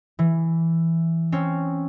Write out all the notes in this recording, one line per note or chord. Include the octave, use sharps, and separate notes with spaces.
E3
C4 C#4